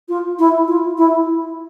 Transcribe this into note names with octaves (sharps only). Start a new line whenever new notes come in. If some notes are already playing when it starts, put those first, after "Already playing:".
F4
E4
F4
E4